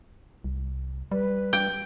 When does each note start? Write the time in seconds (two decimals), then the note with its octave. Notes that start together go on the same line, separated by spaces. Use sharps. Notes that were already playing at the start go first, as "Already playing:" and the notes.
0.44 C2
1.12 G3 B4
1.53 G5